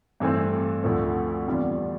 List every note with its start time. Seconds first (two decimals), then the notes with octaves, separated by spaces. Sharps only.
0.20 G2 E3 A3 C4
0.84 D2 D3 F3 A3 C4
1.48 E2 C3 G3 D4 F4